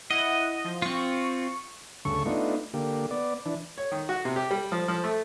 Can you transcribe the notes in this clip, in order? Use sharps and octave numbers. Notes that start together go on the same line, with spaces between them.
E4 D#5 F#5
F3
C4 F4 C#6
D2 G2 C#3 A4 C#6
A3 B3 D4 D#4 F4
D3 A#3 G4
B3 D5
E3 D4
C#5
D#3
F#4
C3
G4
G3
F3
F3
A3